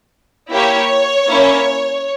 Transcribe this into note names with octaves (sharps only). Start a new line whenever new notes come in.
A#3 E4 G4 C#5
A#3 C#4 E4